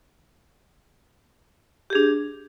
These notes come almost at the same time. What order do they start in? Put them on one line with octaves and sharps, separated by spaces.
G4 G#4 D4